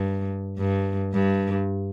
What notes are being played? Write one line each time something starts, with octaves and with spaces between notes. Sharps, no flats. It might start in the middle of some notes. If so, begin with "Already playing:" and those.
Already playing: G2
G2
G2